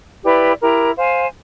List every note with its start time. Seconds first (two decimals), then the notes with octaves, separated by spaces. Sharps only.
0.23 E4 G4 B4 D5
0.60 E4 G4 A#4
0.96 C5 F5 G#5